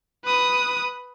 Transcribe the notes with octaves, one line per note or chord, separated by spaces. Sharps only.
B4 D#6